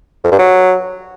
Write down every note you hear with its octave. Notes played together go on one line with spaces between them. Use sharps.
F2
G2
F#3